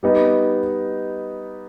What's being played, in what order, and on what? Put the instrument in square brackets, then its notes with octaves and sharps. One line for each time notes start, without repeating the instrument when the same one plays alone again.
[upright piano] G3 B3 D#4